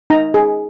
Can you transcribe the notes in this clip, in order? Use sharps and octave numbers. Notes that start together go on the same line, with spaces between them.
D#4 A#5
G#4